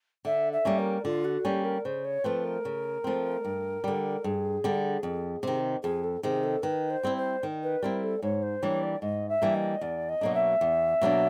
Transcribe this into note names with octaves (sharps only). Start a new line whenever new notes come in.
D3 E5
E5
G3 A#3 C#4
A#4
D3 F4
F#4
G3 A#3 C#4 G4
A#4
C#3 C5
C#5
F3 A3 C4 B4
A#4
C#3
F3 A3 C4
G2
D3 G3
G2 G#4
D3 G3
F2
C3 D#3
F2 G#4
A4
C3 D#3 G#4
A4
D#3 B4
C5
G3 C4 E4
C5
D#3
B4
G3 C4 E4 A#4
A4
G#2 C#5
C5
E3 G3 A#3 D4 C#5
D5
G#2 D#5
E5
E3 G3 A#3 D4
D#5
E2 D5
D#5
B2 F#3 A#3 D4
E5
E2
B2 F#3 A#3 D4